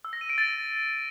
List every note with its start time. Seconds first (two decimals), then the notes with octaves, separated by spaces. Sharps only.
0.05 E6
0.13 A#6
0.21 D#7
0.30 D7
0.38 A6